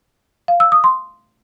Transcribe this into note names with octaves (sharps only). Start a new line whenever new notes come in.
F5
E6
D#6
C6